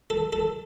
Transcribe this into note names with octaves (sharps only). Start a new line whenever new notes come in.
A4
A4